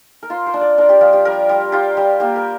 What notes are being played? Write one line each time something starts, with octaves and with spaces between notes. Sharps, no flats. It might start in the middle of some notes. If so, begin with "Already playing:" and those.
A#4
F4 C5
C5
D4
D5
D4 A#4
G4
F3 F4
G4
G3 A#4
G3
F4 G4
G3
A#3 G4
A#4